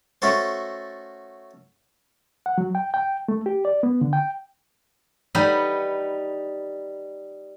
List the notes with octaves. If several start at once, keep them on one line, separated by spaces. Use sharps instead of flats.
A3 C#4 F#4 A4 C5
F#5
F#3
G5
G5
A3
G4
D5
B3
D3
G5
G3 D#4 B4 D#5 F#5